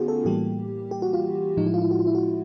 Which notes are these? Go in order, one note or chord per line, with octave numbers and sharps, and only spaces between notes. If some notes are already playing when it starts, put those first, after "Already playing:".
Already playing: D3 A3 B3 C#4 D#4 F4 F#4 G#4
A4
A2 E3 G3 A#3 G4
G4
F#4
F4
A2 F3 G#3 D#4
E4
F4
E4
F#4
F4
E4
F#4